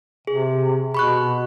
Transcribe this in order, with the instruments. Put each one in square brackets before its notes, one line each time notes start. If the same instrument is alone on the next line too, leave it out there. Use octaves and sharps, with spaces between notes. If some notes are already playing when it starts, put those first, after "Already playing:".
[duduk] C3 [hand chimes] G#4
[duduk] B2 [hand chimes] B5 C#6 F#6